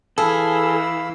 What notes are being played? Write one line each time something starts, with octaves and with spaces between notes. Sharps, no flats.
E3 G#4 A4 F5 B5 E6